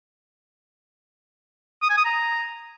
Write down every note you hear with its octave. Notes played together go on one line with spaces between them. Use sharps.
D#6
G#5
D#6
A#5